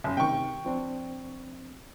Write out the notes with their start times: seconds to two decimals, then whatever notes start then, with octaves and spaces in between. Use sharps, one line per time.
0.04 F#1
0.17 C3 D#3 G5 C#6
0.65 F3 C4 D4